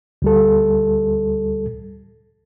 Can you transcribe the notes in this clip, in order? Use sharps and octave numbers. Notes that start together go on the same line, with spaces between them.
D2 G3 A4